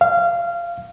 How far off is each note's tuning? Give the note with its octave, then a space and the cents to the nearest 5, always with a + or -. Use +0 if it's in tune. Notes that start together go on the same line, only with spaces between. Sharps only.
F5 -20